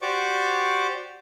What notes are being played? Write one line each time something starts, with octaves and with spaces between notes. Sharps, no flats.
F#4 G4 C5 D5 C#6 D6